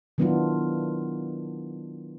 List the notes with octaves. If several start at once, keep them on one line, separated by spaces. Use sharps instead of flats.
D#3 F#3 B3 D4 E4 F4